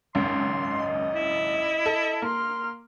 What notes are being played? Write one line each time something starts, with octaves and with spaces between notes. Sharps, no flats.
G#1 C#2 F#2 C6
D#5
E4
A4
A#3 C6 F6